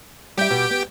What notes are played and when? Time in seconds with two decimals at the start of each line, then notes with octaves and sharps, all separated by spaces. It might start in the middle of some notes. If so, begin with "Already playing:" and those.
0.38 G3 G4 E5 G5
0.50 B2
0.70 B3